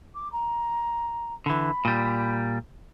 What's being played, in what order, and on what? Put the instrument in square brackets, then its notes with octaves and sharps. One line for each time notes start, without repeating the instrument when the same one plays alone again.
[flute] D6
A#5
[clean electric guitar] D3 E3 [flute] B5
[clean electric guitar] A#2 G3